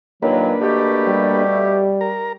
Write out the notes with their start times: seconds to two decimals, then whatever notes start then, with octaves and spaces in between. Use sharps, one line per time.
0.22 D#2 A#2 F#3 A#3 D4 B4
0.62 B2 A3 G4
1.07 G3
2.01 A#4 A#5